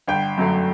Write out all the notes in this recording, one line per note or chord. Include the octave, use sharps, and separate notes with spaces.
G1 G5
F#2 F#3 A3